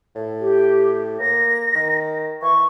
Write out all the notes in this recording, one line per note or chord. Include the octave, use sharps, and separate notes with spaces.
A2
G4
A#3 A#6
D#3
E3 C#6